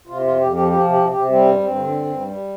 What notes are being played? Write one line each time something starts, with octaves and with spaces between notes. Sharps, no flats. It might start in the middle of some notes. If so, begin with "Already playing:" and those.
C3 F4
F2 F4
F2 G4
F3 G4
F3 G4
C3
G4
C3
C3 G4
G3 C4
G2
G2 C4
D3
G2
G2
G3